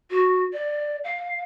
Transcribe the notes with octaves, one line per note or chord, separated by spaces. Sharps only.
F#4
D5
F5